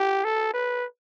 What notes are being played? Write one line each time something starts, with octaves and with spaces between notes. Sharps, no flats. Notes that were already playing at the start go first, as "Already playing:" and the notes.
Already playing: G4
A4
B4